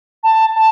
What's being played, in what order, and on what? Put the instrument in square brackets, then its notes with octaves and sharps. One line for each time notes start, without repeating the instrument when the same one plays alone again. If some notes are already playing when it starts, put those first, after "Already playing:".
[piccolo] A5
A5